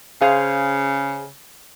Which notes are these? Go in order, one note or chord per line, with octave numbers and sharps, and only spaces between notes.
C#3 G#4 C5 F5